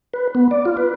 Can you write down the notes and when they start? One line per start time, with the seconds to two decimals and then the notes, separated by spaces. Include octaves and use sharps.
0.14 B4
0.35 B3
0.51 D5
0.65 F4
0.77 B4